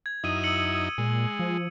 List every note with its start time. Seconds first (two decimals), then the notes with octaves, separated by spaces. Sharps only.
0.06 G#6
0.24 F#2 D#4 E4 D#6 D#7
0.43 E6 C#7 F#7
0.98 A#2 G#3
1.39 F3